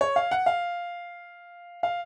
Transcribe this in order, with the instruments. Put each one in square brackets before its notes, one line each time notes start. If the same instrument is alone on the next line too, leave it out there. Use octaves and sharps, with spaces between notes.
[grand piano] C#5
F5
F#5
F5
F5